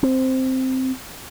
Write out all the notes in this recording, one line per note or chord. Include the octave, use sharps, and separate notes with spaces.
C4